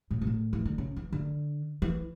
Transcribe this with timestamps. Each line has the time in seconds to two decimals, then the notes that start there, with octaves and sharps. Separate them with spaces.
0.11 A2
0.21 B2
0.27 A2
0.53 E3
0.65 D3
0.78 C#3
0.96 E3
1.13 D3
1.82 E3